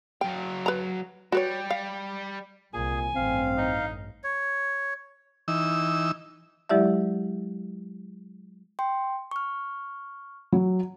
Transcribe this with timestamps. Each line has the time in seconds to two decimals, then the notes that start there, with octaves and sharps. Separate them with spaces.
0.21 F#3 F5 G5
0.66 B4 A#5
1.32 G3 F#4 B4 C#5
1.70 F5
2.74 C2 A#2 G#4 G#5
3.15 A1 G2 C4 F5
3.57 D#4
4.24 C#5
5.48 E3 D#4 E6
6.69 F#3 G#3 E4 G4 D5 E5
8.79 G5 C6
9.31 C#6 F6
10.52 F#3